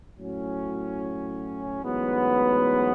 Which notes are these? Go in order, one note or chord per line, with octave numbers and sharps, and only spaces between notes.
A2 F#3 C#4
A1 G#2 F#3 B3